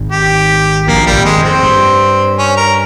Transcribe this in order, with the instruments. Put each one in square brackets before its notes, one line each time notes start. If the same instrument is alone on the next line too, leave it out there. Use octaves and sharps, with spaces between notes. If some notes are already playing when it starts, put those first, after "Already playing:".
Already playing: [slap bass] G#1 G#2
[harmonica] G4
[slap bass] A#1 A#2 [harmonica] A#3
[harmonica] G3
[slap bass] G#1 G#2
[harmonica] G#3
[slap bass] F2
[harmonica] C4
[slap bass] G2
[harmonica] C#4
A#4